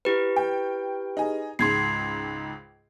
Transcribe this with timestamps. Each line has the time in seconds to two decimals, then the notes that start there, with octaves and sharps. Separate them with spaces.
0.05 E4 G4 B4
0.36 G5
1.17 D#4 G#4
1.59 C#2 G#2 C6 G#6 C7